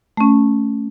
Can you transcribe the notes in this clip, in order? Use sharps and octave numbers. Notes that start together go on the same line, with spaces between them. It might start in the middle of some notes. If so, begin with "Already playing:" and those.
A3 C#4